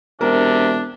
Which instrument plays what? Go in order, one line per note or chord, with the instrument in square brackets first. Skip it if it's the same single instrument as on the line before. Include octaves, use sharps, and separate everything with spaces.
[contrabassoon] E1 [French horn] C3 [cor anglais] D4 [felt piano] A#4